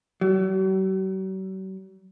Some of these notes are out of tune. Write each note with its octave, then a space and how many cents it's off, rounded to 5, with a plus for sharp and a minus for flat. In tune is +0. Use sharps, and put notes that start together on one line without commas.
F#3 +45